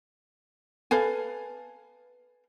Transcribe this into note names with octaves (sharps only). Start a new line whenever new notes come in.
A4 B4 F5 G#5